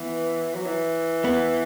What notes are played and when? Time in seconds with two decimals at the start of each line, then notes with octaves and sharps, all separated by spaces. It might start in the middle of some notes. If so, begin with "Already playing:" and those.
Already playing: E3 B3
0.55 F#3
0.66 E3
1.24 B3